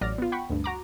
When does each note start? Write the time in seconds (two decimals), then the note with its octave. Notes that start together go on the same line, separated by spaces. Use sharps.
0.01 A1 F#3 D5 F6 A#6
0.18 B3 F4
0.32 F#5 G5 B5 C#6
0.50 D2 G2
0.64 F#4 A#5 D6